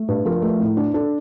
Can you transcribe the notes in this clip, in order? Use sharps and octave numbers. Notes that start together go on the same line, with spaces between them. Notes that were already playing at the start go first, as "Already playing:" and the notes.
Already playing: A3
G2
F3 A#4
A3
A2
D4
D4 A4